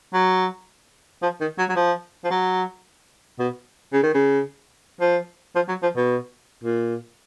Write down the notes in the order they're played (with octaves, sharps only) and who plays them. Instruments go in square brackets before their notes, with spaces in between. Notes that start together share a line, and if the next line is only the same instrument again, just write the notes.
[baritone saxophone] F#3
F3
D#3
F#3
F#3
F3
F3
F#3
B2
C#3
D#3
C#3
F3
F3
F#3
F3
B2
A#2